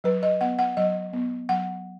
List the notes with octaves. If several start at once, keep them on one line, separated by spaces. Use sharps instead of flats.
F#3 B4
D#5
B3 F#5
F#5
F#3 D#5
B3
F#3 F#5